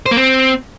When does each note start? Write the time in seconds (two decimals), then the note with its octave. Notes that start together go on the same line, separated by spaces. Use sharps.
0.06 C5
0.11 A#3
0.17 C4